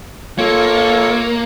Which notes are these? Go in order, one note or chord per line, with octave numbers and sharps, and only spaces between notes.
A#3 F4 A4 C#5